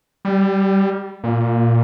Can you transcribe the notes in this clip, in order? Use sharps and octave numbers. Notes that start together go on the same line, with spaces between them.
G3
A#2